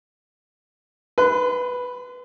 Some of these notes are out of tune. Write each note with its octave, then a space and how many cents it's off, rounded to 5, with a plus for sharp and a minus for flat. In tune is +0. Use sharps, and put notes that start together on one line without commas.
B4 +0 C6 -40